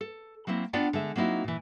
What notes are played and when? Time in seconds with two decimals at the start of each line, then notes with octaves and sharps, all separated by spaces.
0.01 A4
0.47 F#3 A#3 C4 E4
0.73 B3 D4 F4 D5 F#5 G5
0.93 D3 G#3 E5
1.16 F#3 A#3 C4 D#4 E4 F#4
1.44 A#2 E3